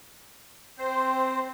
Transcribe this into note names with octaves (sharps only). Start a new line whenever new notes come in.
C4 C5